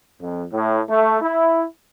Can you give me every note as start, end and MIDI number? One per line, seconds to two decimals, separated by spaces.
0.20 0.43 41
0.52 0.79 45
0.89 1.19 57
1.21 1.63 64